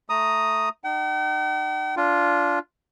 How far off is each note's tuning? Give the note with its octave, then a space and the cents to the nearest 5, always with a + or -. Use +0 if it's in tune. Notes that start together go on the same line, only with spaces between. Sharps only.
A3 +0 A#5 +0 D#6 +0
D#4 -35 G5 -45
D4 -20 F4 +0